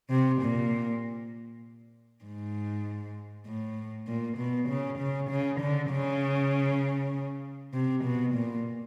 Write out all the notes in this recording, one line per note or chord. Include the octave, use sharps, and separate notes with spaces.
C3
A#2
G#2
A2
A#2
B2
C#3
C#3
C#3
D3
C#3
C3
B2
A#2